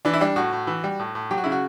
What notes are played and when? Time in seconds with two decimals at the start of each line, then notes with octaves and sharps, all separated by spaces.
0.05 E3 D4
0.14 E4
0.21 G3 D4
0.36 A2 F#4
0.52 A2
0.67 E3
0.84 G3
0.99 A2
1.15 A2
1.31 F#3 G4
1.38 F#4
1.44 C#3 E4
1.52 F#4